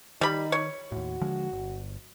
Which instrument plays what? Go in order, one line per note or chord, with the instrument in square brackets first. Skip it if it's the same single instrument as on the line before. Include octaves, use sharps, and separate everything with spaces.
[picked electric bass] D#3 [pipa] G3 B5 [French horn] D#4
[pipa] C#5
[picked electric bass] D#2 A2 [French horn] F#4
[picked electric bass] D3 F3 G#3
G1